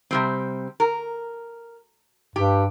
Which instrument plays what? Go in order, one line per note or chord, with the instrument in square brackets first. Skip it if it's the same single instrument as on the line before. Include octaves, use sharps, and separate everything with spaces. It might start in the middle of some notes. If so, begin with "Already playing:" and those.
[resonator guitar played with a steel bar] C3 G3 C4
A#4
[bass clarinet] G2 [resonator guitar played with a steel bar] G4